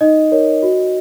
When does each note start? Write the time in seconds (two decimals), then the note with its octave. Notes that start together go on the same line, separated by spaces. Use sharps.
0.01 D#4 D#5
0.32 A#4 C#5
0.63 F#4